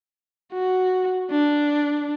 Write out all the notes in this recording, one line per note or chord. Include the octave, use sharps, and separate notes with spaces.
F#4
D4